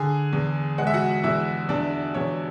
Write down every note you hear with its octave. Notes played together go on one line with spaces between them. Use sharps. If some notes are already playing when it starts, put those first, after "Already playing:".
Already playing: D3 G#4 G#5
E2
G#3 F#5
E5
F#4 F#5
E2 E4 E5
E2 D4 D5
E2 C#5